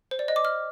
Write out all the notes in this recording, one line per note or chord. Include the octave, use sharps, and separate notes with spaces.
C5
D5
D#5
D6
F6